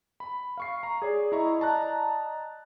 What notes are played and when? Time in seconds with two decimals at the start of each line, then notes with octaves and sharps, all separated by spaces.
0.20 B5
0.57 F5 C#6 C7
0.83 A#5
1.02 G#4 C#5 D5
1.32 E4 D#5 A#5 C#6
1.59 D5 D#5 A5 A#5 F#6